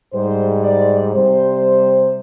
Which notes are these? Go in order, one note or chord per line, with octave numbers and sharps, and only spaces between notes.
G#2 G3 C5
D5
C3 G3 C5